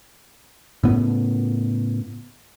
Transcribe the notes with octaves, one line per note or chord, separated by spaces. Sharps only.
A2 C#3 B3